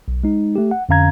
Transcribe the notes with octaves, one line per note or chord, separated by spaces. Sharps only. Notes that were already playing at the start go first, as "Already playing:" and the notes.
B1
G#3 D#4
A3 G4
F#5
F2 D3 C#4 F5 A#5 G#6